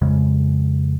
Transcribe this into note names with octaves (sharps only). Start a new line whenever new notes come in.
F2 C#3 G#3